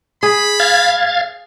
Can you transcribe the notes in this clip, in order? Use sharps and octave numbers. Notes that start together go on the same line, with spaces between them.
G#4 B5
F5 G#6 A6